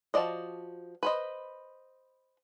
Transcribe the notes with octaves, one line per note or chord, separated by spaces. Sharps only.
F3 F#4 D5 D#5
B4 C5 D#5